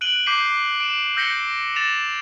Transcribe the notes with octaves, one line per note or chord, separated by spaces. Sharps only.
F#6 D7 D#7 F#7 G7
D6 G6 B6 C7 D#7
D7 E7
E6 G6 A#6 B6 C#7 G7
A6 A#6 E7 F7